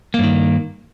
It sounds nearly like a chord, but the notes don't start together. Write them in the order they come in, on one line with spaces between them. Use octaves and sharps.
A#3 G2 D#3